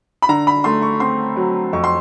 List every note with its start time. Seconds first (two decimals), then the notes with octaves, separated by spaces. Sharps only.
0.22 B5
0.29 D3 A#5
0.47 B5
0.64 A3 C6
0.82 C#6
1.00 C4 C6
1.36 F#3
1.73 F2 C#6
1.84 C6